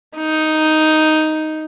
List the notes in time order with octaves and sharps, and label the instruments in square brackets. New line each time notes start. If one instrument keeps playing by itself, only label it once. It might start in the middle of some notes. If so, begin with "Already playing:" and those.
[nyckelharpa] D#4